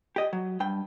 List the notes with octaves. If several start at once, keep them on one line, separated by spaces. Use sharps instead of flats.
G4 D#5
F#3
G2 G5